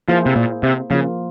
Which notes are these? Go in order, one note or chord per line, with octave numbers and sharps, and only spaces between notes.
F3 A#3 E4 G#4 C5
C3
A#2
C3
C#3 F3 A#3 F4